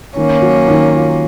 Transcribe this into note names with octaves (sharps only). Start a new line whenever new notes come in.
D#3 A#3 C#4
F#3
D#3
F4